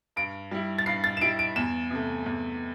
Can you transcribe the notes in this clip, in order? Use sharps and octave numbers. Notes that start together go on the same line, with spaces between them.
G2 D7
G3 E4
A6
G2 C7
A6
E7
G3 E4 D7
D7
E2 E7
C3 A3
E2